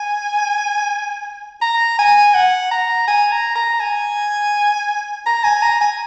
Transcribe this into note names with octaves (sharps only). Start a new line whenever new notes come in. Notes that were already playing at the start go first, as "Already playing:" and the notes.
Already playing: G#5
A#5
G#5
F#5
A#5
G#5
A#5
A#5
G#5
A#5
G#5
A#5
G#5